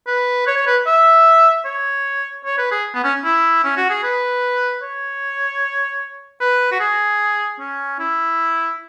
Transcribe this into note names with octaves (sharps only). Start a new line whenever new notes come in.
B4
C#5
C#5
B4
E5
C#5
C#5
B4
G#4
B3
C#4
E4
C#4
F#4
G#4
B4
C#5
B4
F#4
G#4
C#4
E4